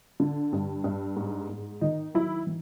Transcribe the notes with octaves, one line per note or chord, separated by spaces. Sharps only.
D3
G2
G2
G#2
G#2
D#3 D#4
F#3 E4
E3